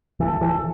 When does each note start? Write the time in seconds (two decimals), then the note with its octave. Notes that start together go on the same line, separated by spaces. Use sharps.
0.20 E3 A4
0.41 E3
0.53 A4